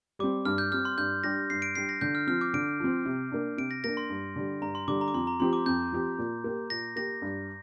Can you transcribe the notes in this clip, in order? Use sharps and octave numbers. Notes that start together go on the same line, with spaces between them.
G3 C4 D6
G2 F6
G6
G3 C4 F6
C6
G2 G6
G3 D4 G4 A#6
G2 C7
D7
G3 D4 G4 C7
A#6
D3 G6
F6
F3 C4 F6
D6
D3 D7
F3 C4
C3
A#3 D4
C3 D7
A#6
A#3 D4 A#6
C6
G2
D3 G3
G2 A#5
C6
D3 G3 D6
A#5
D6
F2 C6
A#5
F3 C4 G4 C6
D6
F2 G6
F3 C4 G4
A#2
A#3 G4
A#2 A#6
A#3 G4 A#6
G2